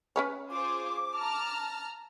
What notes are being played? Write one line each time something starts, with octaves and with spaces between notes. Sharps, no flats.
C#4 B4 C#5
F4 G#4 C5 D6
A5 A#5 F6